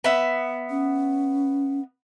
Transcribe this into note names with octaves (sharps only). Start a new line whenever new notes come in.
B3 E5
C#4